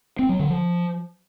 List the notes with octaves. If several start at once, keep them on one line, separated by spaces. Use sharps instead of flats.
C4
F#3
D3
F3